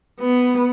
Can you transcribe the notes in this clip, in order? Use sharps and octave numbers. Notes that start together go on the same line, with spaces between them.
B3